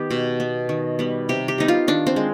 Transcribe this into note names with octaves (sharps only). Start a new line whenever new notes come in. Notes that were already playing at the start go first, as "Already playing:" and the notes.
Already playing: D#3 B3 G4
B2
B3
D#3
G3 B3
C3 G4
G4
G3 B3 D#4
F4
D#3 D4
C4
G#3